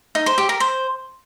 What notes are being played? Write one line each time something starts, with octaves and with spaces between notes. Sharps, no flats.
D#4
C5
G4
A#4
C5